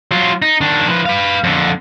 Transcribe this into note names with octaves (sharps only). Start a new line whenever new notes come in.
F#3 F4
D#4
D#3 D4
F3 B4
B4 F5
F2 D3